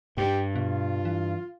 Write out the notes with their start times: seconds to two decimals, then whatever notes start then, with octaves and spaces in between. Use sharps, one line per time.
0.17 G2 G4
0.56 B2 F4
1.05 E3